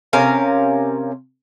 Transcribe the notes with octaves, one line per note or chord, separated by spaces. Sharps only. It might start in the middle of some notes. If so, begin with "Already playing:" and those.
C3 C#4 A#4 F5